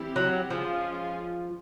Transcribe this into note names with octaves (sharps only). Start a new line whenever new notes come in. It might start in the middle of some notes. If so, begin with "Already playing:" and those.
Already playing: E3 G3 C4 E4 G4
F#3
F3 G#3 C#4 F4 G#4